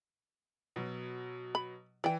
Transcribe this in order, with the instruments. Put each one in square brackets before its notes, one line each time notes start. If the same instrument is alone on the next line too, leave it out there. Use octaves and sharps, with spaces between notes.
[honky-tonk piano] B2 F#3
[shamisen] B5
[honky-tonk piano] E3 [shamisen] D5 G5